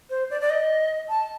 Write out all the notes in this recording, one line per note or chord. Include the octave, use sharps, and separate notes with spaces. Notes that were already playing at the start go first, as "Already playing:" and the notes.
C5
D5
D5
D#5
A5